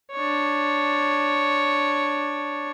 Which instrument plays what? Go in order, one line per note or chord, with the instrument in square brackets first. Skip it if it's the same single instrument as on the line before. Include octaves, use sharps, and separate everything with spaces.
[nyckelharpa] D4 C#5